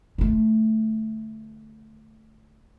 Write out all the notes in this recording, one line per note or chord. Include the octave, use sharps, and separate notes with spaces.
D3 A3